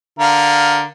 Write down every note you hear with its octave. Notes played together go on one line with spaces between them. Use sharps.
D3 A#4 F5